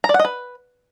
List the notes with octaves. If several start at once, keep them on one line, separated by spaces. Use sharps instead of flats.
A#5
D5
F#5
D#5
B4